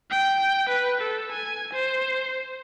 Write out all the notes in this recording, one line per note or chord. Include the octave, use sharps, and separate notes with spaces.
G5
B4
A4
G#5
C5